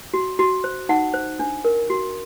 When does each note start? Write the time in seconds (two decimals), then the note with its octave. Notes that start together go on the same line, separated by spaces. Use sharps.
0.14 F#4
0.39 F#4
0.64 C5
0.89 D#4 F#5
1.14 C5
1.39 D4
1.65 A#4
1.90 F#4